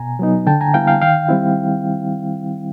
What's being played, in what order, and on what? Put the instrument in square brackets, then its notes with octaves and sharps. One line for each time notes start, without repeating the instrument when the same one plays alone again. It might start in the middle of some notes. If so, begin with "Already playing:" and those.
Already playing: [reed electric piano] B2 G#5 A#5
F#3 B3 D#4
D3 G5 A5
G#5 A#5
G3 B3 E4 F5 G5
F5 G5
D#3 F5 G5
G3 C4 E4